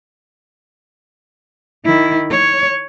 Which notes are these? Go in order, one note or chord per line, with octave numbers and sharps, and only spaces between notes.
D#3 E4
C#5